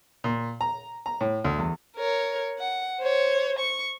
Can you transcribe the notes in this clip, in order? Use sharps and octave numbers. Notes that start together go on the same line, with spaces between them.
A#2
A#5
A#5
A2
D2
E2
A#4 C#5
F#5
C5 C#5
C#6